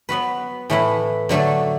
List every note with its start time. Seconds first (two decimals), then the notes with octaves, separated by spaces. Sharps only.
0.09 F#3 B3 F#4 B4
0.70 A2 E3 A3 E4 B4
1.29 D3 F#3 A3 D4 A4